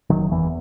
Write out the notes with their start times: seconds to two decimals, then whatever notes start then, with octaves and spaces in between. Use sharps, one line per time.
0.10 F#1 D#3 F#3
0.31 E2 E3